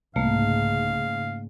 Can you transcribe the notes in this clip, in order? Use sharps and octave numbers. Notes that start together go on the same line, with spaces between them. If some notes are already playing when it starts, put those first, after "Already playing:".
C2 G#2 C#3 A3 A#3 F5